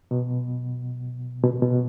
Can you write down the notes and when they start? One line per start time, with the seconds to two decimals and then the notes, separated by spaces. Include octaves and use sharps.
0.11 B2
1.43 B2
1.63 B2